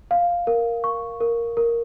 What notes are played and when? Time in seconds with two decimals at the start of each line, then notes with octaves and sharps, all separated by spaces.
0.11 F5
0.47 A#4
0.84 C#6
1.21 A#4
1.57 A#4